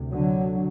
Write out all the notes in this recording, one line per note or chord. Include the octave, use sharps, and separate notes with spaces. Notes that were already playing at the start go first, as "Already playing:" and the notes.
Already playing: D2 C3
D3 F#3